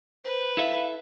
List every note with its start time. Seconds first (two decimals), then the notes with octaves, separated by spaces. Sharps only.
0.25 B4 C5
0.57 E4 A4 E5 F5